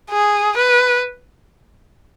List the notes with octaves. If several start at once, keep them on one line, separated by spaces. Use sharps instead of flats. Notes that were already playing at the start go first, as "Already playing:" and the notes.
G#4
B4